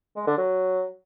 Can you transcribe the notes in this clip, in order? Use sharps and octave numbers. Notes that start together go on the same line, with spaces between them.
G#3
D3
F#3